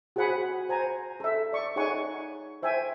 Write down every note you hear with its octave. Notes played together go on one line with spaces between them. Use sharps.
F#4 G#4 C5 F#5 G#5 B5
C5 G#5 A#5
A4 E5
D5 C#6
D#4 G#4 C#5 F#5 G#5 C#6
C5 E5 G5 G#5